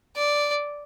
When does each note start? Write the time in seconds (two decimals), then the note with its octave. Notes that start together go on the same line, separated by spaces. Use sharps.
0.16 D5